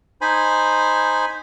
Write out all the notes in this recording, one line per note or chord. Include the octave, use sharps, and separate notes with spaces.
D#4 C5 G#5 B5